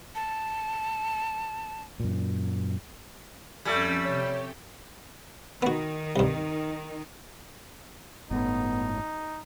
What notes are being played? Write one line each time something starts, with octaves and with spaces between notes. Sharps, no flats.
A5
F#2 A#2
F2 G3 A3 C#4 A4 G#5 E6
C3 G4 C#5
D#3 B3 F#4
C2 G2
G1 A2 B3 D#4